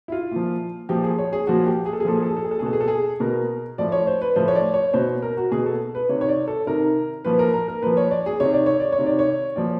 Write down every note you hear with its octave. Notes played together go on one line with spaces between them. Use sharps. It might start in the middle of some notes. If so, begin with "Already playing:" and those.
E4
F4
A#2 F3
A#2 F3 G4
G#4
C#5
G#4
A#2 F3 F#4
G4
G#4
A4
G#4
A#2 F3 A4
G#4
A4
G#4
A4
G#4
A4
G#4
B2 A4
G#4
A4
G#4
B2 A#4
A2 F3 D5
C#5
C5
B4
A2 F3 C5
C#5
D5
C#5
B2 C5
A#4
F#4
B2 G#4
A4
B4
C3 D#3 C#5
C#5
D5
A4
C3 D#3 A#4
A#2 F3 B4
A#4
A#4
A#4
A#2 F3 B4
C#5
D5
G#4
C3 D#3 C#5
D5
C#5
D5
C#5
C3 D#3
D5
C#5
A#2 F3 D5